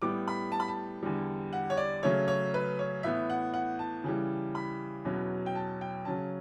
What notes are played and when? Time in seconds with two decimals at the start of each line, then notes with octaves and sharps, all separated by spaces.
0.02 A2 G3 B3 D6
0.28 B5
0.52 A5
0.60 B5
0.68 A5
1.03 E2 D3 G3
1.53 F#5
1.70 C#5
1.77 D5
2.03 C#3 F#3 A3 C#4 C#5
2.28 C#5
2.54 B4
2.79 C#5
3.03 A2 E3 B3 E5
3.30 F#5
3.54 F#5
3.79 A5
4.04 C#3 E3 G3
4.55 B5
5.05 E2 B2 F#3 C#4
5.46 G5
5.55 A5
5.81 G5
6.05 C#3 F#3 C#4 A5